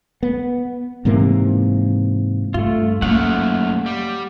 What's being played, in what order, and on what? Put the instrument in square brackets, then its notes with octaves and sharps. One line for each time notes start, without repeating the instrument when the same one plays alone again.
[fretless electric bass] B3
G#2 C3 E3 A#3
[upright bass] G2 [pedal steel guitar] A3 F4
[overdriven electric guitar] F#2 A3 [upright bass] A#3 [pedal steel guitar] F5 F#5
[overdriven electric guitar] G3